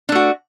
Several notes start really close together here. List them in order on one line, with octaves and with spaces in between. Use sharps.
D4 A3 F#4